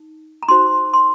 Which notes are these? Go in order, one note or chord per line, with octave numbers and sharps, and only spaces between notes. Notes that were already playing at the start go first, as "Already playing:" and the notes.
Already playing: D#4
A#5
D#4 F#4 C5 C6
C6